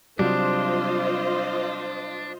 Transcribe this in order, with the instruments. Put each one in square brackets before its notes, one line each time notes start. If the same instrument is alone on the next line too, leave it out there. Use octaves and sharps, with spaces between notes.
[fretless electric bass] C3 F#3 G3 [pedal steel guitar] D4 [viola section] F4 C5 D#5